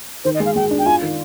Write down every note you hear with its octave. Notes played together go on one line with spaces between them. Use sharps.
D#3 C5
D#5
G#3
F5
G#3 G5
D4
G5
F4 G#5
D#3